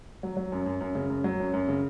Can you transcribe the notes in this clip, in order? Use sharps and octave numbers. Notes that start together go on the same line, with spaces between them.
F#3
F#3
F#2
F#2
F#2
C#3
F#2
F#3
F#2
F#2
C#3